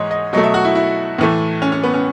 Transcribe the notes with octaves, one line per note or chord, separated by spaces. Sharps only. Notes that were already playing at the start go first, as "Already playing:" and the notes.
Already playing: G#2 E3 G#3 C#5 D#5
D#5
B2 F#3 A3 D#5
E5
F#4
E4
E4
A2 E3 A3
C#4
C#4
B3
C#4